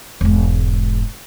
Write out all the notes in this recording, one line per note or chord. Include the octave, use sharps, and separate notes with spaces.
E1 G#2